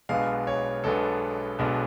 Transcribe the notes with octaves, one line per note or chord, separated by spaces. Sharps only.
B1 B2 G#3 B3 D4 F5
C#5
B1 B2 G#3 B3 D4 A4
B1 B2 G#3 B3 D4